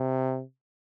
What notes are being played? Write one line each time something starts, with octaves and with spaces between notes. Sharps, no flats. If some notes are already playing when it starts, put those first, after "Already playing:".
Already playing: C3